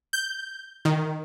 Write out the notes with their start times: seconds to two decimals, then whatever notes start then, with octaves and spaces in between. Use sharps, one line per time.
0.13 G6
0.85 D#3